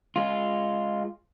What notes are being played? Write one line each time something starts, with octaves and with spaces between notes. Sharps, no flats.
G#3 F4